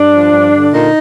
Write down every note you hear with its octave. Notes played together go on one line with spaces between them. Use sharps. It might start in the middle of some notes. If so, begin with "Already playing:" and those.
Already playing: G2 D4
F3
G2
D3
A#2 D#4